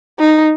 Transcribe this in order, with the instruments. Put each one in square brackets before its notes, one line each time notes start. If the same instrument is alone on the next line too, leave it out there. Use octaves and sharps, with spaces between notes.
[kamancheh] D#4